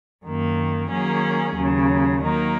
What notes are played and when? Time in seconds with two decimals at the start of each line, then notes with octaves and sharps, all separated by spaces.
0.24 F#2 D#3 A#3
0.89 D#3 F#3 A#3 C#4 G#4
1.55 D#2 C#3 F#3
2.21 D#3 F#3 A#3 D#4